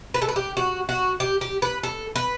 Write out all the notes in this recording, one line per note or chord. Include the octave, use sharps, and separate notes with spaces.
B4
A4
B4
G4
F#4
F#4
G4
G4
B4
A4
B4